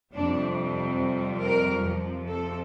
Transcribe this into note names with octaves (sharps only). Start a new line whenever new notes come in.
F2 C3 G3 D4
A#4
F2 C3 F3
A4